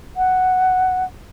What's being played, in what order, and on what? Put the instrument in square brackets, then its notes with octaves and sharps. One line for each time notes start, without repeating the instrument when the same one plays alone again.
[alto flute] F#5